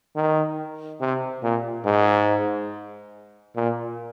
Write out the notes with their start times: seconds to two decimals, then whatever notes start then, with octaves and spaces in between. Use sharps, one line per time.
0.16 D#3
1.00 C3
1.43 A#2
1.85 G#2
3.56 A#2